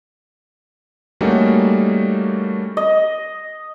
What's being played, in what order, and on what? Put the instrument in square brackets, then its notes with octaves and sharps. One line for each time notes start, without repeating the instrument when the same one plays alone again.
[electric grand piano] G3 A3 A#3 C#4 D#4 F#4
[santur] D#5